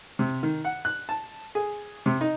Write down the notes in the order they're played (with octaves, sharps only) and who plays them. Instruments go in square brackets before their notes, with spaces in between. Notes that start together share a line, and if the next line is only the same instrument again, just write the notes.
[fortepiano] C3
D#3
F#5
F#6
A5
G#4
C3
D#4